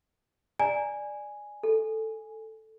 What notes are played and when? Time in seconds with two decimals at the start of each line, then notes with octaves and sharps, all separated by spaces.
0.60 D5 G#5 A#5
1.63 A4